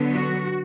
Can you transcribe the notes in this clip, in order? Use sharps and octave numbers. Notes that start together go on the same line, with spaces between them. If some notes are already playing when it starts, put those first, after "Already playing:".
Already playing: D3 F#3 B3
F#4